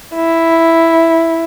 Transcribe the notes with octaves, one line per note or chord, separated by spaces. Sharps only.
E4